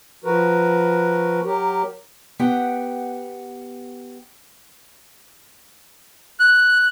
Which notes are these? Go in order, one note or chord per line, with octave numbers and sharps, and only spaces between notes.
F3 F#4 A#4 B4
F#3 G4 A#4
B3 G4 F#5 G5
F#6